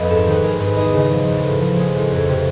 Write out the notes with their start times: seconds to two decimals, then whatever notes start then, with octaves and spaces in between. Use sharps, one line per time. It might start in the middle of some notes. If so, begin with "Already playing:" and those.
Already playing: F2 F3 B4 D#5
0.10 G#2 A4
0.27 D#3 B4
0.44 G#3 A#4
0.60 G#2 B4
0.77 E2 D#5
0.94 C#3
1.00 D#5
1.11 F3
1.28 E2
1.44 A2
1.60 F3
1.77 G#3
1.94 A2
2.12 F2
2.29 C3